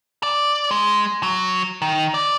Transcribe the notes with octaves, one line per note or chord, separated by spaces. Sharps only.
D5
G#3
F#3
D#3
D5